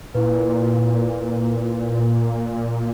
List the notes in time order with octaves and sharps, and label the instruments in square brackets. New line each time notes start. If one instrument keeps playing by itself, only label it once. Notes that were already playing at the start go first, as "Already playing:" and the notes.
[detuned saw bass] A#2 [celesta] E4 B4